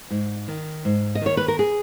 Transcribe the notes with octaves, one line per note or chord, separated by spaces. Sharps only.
G#2
D#3
G#2
D#5
D#3 C#5
B4
A#4
G#4